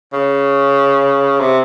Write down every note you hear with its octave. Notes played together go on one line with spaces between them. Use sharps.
C#3
C3